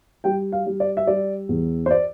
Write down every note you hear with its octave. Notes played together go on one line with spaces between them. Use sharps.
G3 G5
F5
G3
D5
E5
G3 D5
E2
C5
D5